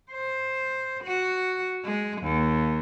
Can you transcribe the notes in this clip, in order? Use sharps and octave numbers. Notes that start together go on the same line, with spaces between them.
C5
F#4
G#3
D#2